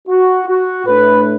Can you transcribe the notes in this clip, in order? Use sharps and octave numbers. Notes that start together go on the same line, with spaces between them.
F#4
F#4
A2 A3 D4 B4